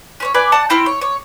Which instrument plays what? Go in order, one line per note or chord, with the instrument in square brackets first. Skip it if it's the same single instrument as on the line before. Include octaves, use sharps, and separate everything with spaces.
[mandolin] C#4 C5 C#5
B4 D5 G#5
D5 F#5 A5
C4 E4 G5 F6
C#5
C#5